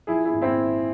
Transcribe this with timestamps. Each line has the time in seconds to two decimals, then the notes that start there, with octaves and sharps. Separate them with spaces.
0.07 F3 E4 G#4
0.25 E4 G#4
0.34 G#1
0.42 C4 E4